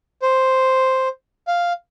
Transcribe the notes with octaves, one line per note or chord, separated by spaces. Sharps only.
C5
F5